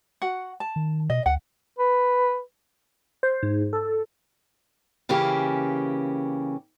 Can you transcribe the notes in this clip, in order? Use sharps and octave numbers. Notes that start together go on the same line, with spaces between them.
F#4 F#5
A5
D#3
B2 D#5
D2 F#5
B4
C5
G#2
A4
C#3 E3 A#3 C#4 G4